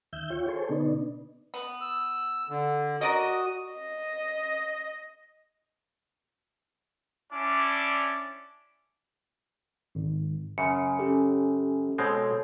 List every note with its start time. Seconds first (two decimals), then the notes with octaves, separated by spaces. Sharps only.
0.13 D#2 E5 G6
0.30 F4 C#5 G5
0.48 G#4 A4 C5 C#5
0.69 B2 D3 B3 D4 D#4
1.54 B3
1.81 E6
2.49 D3
3.01 F#4 A#4 D5 D#5 D#6
3.72 D#5
7.32 C#4 D4 E4 D5
9.95 G#1
10.58 F#2 C#3 C#7
10.99 C#4 G4 A4
11.98 B2 G#3 C4 A4 C#5